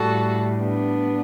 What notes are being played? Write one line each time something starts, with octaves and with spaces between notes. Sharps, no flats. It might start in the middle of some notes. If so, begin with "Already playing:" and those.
Already playing: A2 G3 F#4 A4
B3 D4